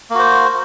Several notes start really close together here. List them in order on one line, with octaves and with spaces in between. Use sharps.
A#3 F#4 C5